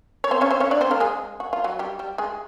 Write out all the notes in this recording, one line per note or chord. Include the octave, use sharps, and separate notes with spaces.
C#5
C4 C5
C#4 C#5
C4 C5
C#4 C#5
D4 D5
C4 C5
A#3 A#4
G#3 G#4
F#4
F4
F#3 F#4
G3 G4
G3 G4
G#3 G#4